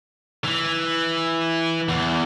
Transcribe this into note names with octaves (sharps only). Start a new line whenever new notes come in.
E3
E2